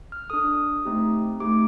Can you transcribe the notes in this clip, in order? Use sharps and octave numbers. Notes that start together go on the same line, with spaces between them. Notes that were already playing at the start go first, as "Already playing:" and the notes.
F6
D4 A4 D#6
A3 C4 D#4 G4
A3 C4 D#4 G4 D6